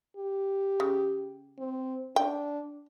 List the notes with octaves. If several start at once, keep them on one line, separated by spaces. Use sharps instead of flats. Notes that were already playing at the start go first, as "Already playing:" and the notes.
G4
C#3
C4
D4 G5